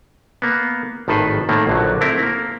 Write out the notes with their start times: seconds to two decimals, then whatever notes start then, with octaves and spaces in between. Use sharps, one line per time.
0.42 A#3 B3
1.08 G#1 A2 D#3 A4 B4 C5
1.49 A2 D#3 A3 A#3
1.67 A#1 D3 F#3
2.01 A3 C4 E4 A#4
2.23 A#3